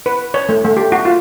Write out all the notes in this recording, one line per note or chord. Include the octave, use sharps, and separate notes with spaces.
B4
C#5
A3
A3
G4
F#4
F4